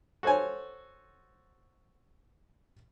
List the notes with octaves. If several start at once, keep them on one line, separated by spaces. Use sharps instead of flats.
F#4 A4 C5 C#5 G#5